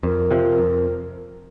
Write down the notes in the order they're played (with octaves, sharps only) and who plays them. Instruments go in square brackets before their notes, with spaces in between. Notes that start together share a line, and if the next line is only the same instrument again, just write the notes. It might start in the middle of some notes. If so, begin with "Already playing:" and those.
[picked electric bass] F2 [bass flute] A#4
[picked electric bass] C3 F3
F2